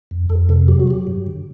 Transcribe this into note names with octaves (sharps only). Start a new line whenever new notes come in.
F2
F2 A4
C3 A4
F#3 G4
F#4
F#3 G4
G2
D3